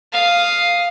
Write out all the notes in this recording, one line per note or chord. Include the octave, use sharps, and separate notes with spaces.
F5 D#6